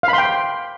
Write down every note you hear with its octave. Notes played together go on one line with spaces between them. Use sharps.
F5 G5 B5 C6